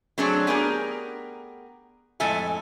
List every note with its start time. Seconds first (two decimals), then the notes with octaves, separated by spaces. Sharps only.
0.18 F#3 A3 C4 D4 G#4 C#5
0.47 B3 G4 G#4 A#4
2.20 F2 A2 G#3 A4 E5 G#5